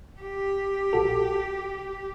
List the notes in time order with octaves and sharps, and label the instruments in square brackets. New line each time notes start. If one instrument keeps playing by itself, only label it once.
[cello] G4
[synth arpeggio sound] A#1 F#4 A4